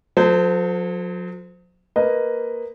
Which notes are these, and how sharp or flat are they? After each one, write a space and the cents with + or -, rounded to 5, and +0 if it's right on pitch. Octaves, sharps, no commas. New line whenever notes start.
F#3 -40 A4 +15 C5 -25
A#3 +0 B4 +5 D#5 +0